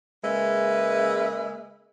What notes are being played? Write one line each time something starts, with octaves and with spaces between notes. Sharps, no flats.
C#3 G#3 A#3 B4 D#5 E5